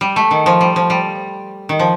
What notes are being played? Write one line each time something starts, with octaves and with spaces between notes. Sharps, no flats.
G3
A3
D#3
F3
G3
F3
G3
D#3
F3